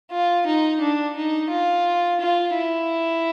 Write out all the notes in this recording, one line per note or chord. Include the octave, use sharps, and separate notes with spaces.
F4
D#4
D4
D#4
F4
F4
E4